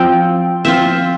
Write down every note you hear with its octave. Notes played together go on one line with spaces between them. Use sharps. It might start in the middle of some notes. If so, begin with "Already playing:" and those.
Already playing: F3 C4 F4 G5
F3 C4 F4 E5